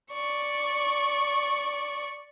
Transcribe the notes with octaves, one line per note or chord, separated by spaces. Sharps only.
D5 C#6